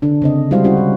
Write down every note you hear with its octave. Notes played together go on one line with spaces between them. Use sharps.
D3 D4
C#3 C4 D#5
G3 G#3 E4 F#4 C5 F5
C#4 E4 F#4 C5
C#3